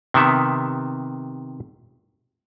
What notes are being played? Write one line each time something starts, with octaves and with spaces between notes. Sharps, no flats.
C3 D#3 B3 E5